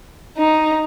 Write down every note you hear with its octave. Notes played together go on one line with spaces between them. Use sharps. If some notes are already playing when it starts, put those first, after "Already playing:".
D#4